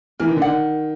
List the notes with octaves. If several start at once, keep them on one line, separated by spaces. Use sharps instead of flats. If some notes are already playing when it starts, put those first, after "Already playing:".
E3 A#4
D#3
D3
D#3 F#5